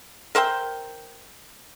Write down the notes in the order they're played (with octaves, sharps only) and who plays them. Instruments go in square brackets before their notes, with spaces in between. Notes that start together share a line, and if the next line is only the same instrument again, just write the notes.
[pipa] A#4 C5 E5 G5